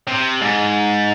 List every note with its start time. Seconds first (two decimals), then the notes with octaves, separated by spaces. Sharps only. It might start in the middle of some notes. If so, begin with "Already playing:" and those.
0.08 C3
0.42 G#2